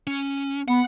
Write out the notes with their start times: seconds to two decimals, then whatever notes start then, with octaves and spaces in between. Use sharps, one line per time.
0.07 C#4
0.68 B3 F#5